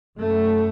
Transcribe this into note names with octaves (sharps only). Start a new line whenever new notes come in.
F#2 A3